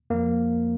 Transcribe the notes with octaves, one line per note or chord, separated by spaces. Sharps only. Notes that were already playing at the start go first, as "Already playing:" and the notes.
F2 F3 A#3